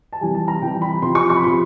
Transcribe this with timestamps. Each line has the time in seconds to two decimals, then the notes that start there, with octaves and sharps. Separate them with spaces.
0.13 A5
0.21 C3 E3 G3 G#5
0.35 A5
0.48 A#5
0.61 C3 E3 G3 G5
0.82 B5
1.02 C3 F3 C6
1.15 C#6
1.30 C#6
1.36 B5
1.43 C3 F3 C6